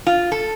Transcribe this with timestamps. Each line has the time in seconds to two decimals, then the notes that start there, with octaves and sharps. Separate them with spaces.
0.07 F4
0.32 A4